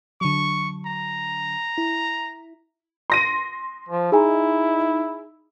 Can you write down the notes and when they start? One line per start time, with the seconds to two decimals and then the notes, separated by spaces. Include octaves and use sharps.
0.21 D3 F#3 C#6
0.86 A#5
1.78 E4
3.10 C6 A#6 D#7
3.89 F3
4.12 D#4 E4 G#4 G#5 A#5